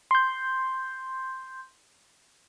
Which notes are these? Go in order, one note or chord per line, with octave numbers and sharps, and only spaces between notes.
C6 G6